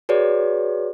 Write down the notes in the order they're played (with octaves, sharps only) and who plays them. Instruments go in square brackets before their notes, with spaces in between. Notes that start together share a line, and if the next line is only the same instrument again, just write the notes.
[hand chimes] F#4 G#4 B4 C#5 D5